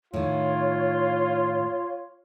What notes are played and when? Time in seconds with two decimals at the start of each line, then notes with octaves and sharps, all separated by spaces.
0.13 A2 D#3 F4 C#5